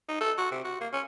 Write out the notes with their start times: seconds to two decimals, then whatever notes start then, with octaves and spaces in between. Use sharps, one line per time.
0.09 D#4
0.20 A4
0.38 F#4
0.51 C3
0.64 F#4
0.81 A#3
0.93 C#4